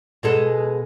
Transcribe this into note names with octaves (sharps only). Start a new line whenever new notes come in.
B2 G#3 A4